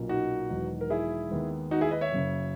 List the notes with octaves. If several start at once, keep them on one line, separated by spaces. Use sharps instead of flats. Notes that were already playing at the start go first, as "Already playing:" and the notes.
Already playing: B1 A#2 A#3 C#4
D#4 F#4
E1 E2 D#3 F#3 B3
A#4
E4 G#4
D#2 D#3 G#3 B3
D#4 F#4
E4 G#4
B4 D#5
C#5 E5
F#1 F#2 C#3